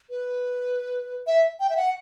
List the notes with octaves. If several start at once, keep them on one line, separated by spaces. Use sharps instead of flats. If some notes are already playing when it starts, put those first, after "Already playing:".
B4
E5
G5
E5
F#5